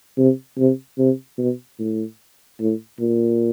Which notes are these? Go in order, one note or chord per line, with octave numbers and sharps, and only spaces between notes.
C3
C3
C3
B2
A2
A2
A#2